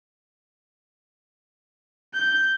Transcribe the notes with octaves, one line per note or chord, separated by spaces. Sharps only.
G6